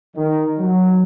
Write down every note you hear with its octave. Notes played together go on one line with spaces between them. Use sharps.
D#3
F#3